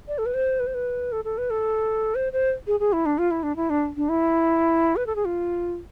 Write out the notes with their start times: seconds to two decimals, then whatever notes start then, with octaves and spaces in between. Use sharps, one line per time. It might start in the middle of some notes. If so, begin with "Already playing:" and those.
0.08 D5
0.18 A4
0.26 B4
0.34 C5
0.60 B4
0.67 C5
0.74 B4
1.12 A4
1.25 A4
1.38 B4
1.50 A4
2.15 C5
2.33 C5
2.67 G#4
2.80 G#4
2.93 E4
3.06 D4
3.18 F4
3.31 E4
3.43 D4
3.56 E4
3.70 D4
3.97 D4
4.09 E4
4.96 B4
5.06 A4
5.16 G#4
5.25 F4